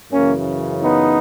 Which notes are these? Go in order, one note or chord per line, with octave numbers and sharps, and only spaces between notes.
F#2 C#3 E3 A#3 C#4
B3 D#4